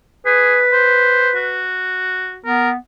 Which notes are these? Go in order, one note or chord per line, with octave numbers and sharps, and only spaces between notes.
G#4 B4
C5
F#4
B3 A#4